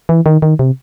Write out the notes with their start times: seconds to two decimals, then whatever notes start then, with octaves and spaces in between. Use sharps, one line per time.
0.09 E3
0.26 D#3
0.42 D#3
0.59 C3